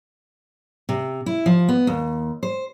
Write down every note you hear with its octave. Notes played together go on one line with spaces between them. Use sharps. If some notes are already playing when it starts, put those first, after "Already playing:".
C3
E4
F3
B3
D#2
C5